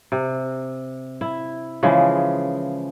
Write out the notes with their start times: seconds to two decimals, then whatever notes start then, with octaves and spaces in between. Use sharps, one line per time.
0.12 C3
1.21 E4
1.83 C#3 E3 F3 G#3